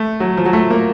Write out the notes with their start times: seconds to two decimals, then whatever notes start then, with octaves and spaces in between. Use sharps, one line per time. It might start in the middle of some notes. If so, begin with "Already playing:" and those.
Already playing: A3
0.20 F#3
0.37 F3
0.46 F#3
0.53 A3
0.71 A#3